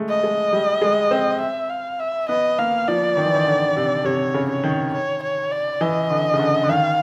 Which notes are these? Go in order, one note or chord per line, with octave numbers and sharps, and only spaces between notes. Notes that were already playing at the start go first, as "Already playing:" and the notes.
Already playing: G#3 A3
D#5
G#3
G3
G#3
C4
E5
F5
E5
B3 D#5
A#3 F5
F3 D5
D#3
E3
D#3
D3
C3
C3 C#5
C#3
C#5
D#3
C#5
C#5
D5
E3 D#5
D3
C#3
D3
D3
D#3 F5